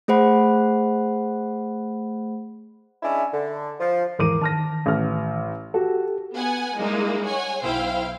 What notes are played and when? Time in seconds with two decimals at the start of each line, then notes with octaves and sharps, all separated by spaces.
0.08 A3 G#4 C5 F#5 B5
3.02 G#3 C#4 D4 E4
3.32 D3
3.80 F3
4.19 D#2 G#2 E3 A#4 D6 D#7
4.41 D#3 A5 F6 A#6
4.86 A1 F6
5.74 F#4 G4 A4
6.35 B3 F#5 G#5
6.77 G3 G#3 A#3 D#4 E4
7.25 C#5 F#5 G#5
7.62 B1 E4 C5 F5 G5